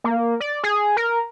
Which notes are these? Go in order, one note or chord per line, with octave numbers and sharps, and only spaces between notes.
A#3
D5
G#4
A#4